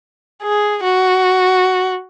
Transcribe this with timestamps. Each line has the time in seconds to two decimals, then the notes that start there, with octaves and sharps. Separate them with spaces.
0.43 G#4
0.84 F#4